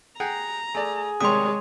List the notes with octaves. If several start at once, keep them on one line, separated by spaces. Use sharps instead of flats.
G#4 F#5 G5 A#5
A3 G#4 D5
C3 D#3 G3 G#3 C#5 C6 D#6